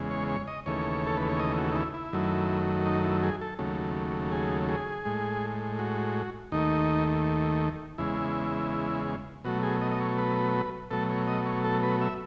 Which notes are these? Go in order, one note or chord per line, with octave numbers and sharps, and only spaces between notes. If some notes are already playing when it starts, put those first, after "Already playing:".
Already playing: E2 C#3 G#3
C#5
C#5
D#5
D#2 C#3 E3 A3 C#5
A4
B4
C#5
D#5
F#4
D#4
E4
E4
F#2 D#3 F#3 A3
D#4
E4
G#4
A4
D#2 C#3 F#3 A3
G#4
G#4
A2 G#3
F#4
D#2 D#3 A3 D#4
E2 C#3 G#3 E4
B2 F#3 A3 F#4
G#4
D#5
D#5
C#5
B4
B2 F#3 A3 A4
C#5
D#5
C#5
A4
B4
E5